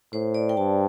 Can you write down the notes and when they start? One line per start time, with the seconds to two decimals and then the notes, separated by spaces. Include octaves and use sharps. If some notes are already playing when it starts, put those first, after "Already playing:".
0.13 A2 C5
0.34 D5
0.49 G5
0.57 G2 A5